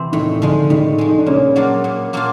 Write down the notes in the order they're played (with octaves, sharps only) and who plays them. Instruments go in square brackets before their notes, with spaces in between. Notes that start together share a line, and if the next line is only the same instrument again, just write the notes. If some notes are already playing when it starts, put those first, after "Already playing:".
Already playing: [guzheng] C3 E3 C4
[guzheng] A2 [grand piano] D#3 D#4
[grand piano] D#4
[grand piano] D3 D4 [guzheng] F3 G#3
[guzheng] A2 [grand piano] D#3 D#4
[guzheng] F3 G#3
[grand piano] D#4
D4
[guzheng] A#2 [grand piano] C#3 C#4
[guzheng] F#3 A#3 D4 F4
A#2
F#3 A#3 D4 F4